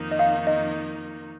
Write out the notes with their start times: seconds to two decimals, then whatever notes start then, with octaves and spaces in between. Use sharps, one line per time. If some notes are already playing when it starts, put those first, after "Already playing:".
Already playing: F2 D#3 A#3 D#4
0.11 D#5
0.19 F5
0.47 D#5